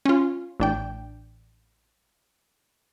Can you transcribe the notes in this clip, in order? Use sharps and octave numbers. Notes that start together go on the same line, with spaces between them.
C#4 F4
A1 D4 G5